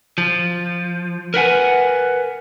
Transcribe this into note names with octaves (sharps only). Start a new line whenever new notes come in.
F3
A#4 B4 F#5 G#5